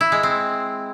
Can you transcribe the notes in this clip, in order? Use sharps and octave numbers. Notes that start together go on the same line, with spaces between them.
E4
G#3
C4